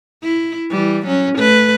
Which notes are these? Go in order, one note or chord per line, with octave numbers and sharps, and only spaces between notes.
E4
E3 G3
F#3 C#4
A3 B4